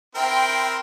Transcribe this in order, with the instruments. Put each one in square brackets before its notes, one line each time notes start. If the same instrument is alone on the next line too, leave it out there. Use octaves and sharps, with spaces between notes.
[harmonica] C4 E4 A#4 [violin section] G5 C6